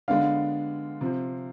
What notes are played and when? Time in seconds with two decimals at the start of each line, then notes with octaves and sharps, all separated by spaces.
0.08 D3 G#3 B3 D4 F5
1.01 C3 F3 C4